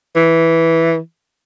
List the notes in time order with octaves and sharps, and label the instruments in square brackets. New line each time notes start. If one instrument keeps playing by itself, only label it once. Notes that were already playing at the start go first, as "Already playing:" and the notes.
[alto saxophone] E3